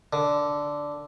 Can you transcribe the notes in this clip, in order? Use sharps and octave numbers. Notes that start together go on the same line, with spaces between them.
D3